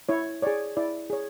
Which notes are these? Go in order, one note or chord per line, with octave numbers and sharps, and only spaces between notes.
E4 C#5
G#4 C#5 D5
E4 D5
G#4 C#5